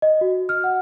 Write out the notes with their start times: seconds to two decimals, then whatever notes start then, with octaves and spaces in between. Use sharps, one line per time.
0.02 D#5
0.21 F#4
0.49 F6
0.64 F#5